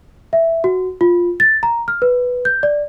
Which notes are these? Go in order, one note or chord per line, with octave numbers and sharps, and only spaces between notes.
E5
F#4
F4
A6
A#5
F6
B4
G6
D5